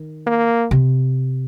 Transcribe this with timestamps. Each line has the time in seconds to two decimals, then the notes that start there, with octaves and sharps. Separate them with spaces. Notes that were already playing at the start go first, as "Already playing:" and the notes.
Already playing: D#3
0.27 A#3
0.71 C3